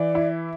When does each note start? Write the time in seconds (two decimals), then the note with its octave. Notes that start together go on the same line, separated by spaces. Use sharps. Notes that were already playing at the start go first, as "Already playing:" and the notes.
Already playing: E3 D5
0.15 E4